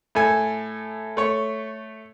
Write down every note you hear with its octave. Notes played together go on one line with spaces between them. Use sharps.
A2 A4 G#5
A3 C#5